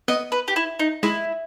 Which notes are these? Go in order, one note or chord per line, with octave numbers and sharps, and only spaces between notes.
B3 D#5
B4
G4
E4
D#4
G#3 E4